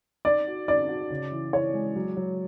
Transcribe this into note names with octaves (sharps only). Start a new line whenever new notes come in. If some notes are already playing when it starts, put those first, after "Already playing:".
D#4 D5
F#4
D#4 D5
F#4
C#3
E3
E3 C#5
G#3
F#3
F#3